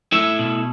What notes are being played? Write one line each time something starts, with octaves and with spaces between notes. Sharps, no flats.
A3 E4 E5
B2